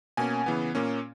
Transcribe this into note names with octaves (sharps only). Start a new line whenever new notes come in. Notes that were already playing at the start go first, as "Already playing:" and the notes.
B2 A#3 C#4 G#5
C#3 E3 B3
A#2 A#3 C#4